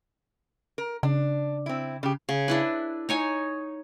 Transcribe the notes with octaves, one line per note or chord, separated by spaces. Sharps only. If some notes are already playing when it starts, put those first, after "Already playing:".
A#4
C#3 D4
C4 E4
C#3 G4
C#3
D4 E4 B4
D#4 C#5 G#5